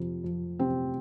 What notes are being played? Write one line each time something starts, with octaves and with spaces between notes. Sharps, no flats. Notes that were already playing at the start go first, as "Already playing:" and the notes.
Already playing: F2 C3
F2
C3 C4